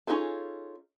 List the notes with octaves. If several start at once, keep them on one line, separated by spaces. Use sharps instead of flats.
C#4 D#4 F4 G#4 A4